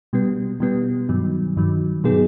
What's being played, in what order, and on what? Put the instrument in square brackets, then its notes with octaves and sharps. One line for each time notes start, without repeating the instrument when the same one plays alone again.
[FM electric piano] B2 G3 B3
B2 G3 B3
G2 D#3 F#3
G2 D#3 F#3
B2 F#3 B3 D#4 G#4